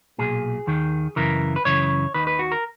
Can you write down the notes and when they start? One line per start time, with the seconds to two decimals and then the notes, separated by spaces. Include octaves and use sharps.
0.18 B1 A#2 G#4
0.67 D#2 D#3
1.16 F#2 C#3 E3 A#4
1.56 B4
1.65 F#2 C#3 E3 C#5
2.14 D#2 D#3 B4
2.27 B4
2.39 F#4
2.52 A#4